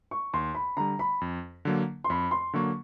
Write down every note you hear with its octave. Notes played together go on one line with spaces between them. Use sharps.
C#6
D#2 C6
B5
D3 G3 A#5
B5
F2
D3 F#3 A#3
C6
F2 B5
C6
D3 F#3 A#3 C#6